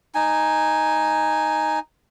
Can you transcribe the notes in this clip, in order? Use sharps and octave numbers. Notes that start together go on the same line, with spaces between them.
D#4 G#5